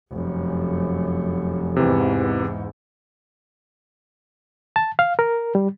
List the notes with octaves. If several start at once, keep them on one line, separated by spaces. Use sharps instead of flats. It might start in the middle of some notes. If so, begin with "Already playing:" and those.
F1 F#2
E2 G#2 C3 E3
A5
F5
A#4
G3